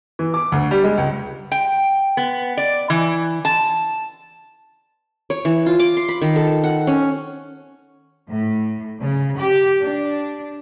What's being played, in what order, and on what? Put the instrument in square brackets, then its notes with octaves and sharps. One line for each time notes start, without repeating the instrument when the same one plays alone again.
[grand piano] E3
D6
D2
G3
G#3
C#2
[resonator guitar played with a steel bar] G5
B3
D5
E3
A5
[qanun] C#5
E3
F4
D6
C6
B5
D#3
A4
F#5
C#4
[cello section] A2
C#3
G4
D4